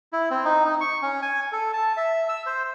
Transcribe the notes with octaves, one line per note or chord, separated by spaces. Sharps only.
E4
C4
D#4
D#4
C#6
C#4
G#5
A4
A5
E5
E6
C5